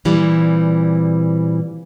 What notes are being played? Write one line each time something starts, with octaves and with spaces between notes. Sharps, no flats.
A#2 E3 G3 C4